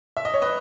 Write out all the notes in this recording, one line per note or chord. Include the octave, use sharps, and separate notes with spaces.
E5
D#5
C#5
B4 D#5